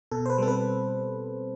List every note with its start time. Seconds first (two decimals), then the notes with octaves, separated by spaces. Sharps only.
0.11 B2 A4
0.26 C5
0.30 B4
0.38 G3 C4 A4
0.48 B4